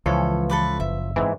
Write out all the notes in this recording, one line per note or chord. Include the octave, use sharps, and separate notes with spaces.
C#2 E3 F3 E4 A4 C#5
A4 B4 D6
F#1 E5
G#2 E3 C4 E4